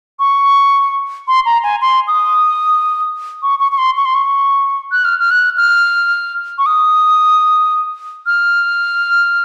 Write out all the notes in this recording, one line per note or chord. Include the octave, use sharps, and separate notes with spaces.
C#6
C6
A#5
G#5
C6
D#6
C#6
C#6
C#6
C6
C#6
C6
C#6
F#6
F6
F6
F#6
F6
C#6
D#6
F6